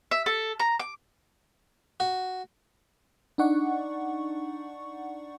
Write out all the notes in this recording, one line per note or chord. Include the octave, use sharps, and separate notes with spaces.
E5
A4
A#5
D6
F#4
D4 D#4 D5 F#5 C#6